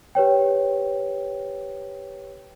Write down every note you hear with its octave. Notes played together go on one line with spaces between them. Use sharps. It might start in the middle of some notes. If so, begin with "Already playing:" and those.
G4 B4 C#5 G5